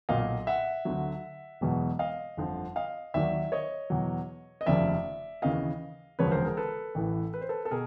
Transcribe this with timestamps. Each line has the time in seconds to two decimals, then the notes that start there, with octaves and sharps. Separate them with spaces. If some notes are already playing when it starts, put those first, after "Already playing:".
0.09 B1 A#2 F#3 D#5 F5
0.47 E5 F#5
0.85 D2 D3 F#3
1.61 E1 E2 B2 F#3
1.99 D#5 F5
2.37 G1 F2 D3 F3
2.76 D#5 F5
3.14 D#2 D#3 F#3 D5 E5
3.52 C#5 D#5
3.90 E2 B2 F#3
4.61 D#5
4.66 F1 D#2 C#3 F3 D5 E5
5.42 D#2 C#3 E3 D#5 F5
6.19 E1 D2 C#3 F3 B4 C#5
6.31 A#4 C5
6.45 G#4 A#4
6.57 A4 B4
6.95 A1 A2 E3
7.34 B4
7.41 C5
7.49 A4 B4
7.65 A4
7.71 B2 G#4 A#4